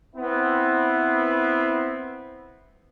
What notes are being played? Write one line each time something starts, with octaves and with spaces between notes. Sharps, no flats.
B3 C4 E4